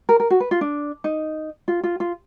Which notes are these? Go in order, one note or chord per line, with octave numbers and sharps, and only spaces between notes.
A#4
A#4
F#4
B4
F4
D4
D#4
F4
F4
F4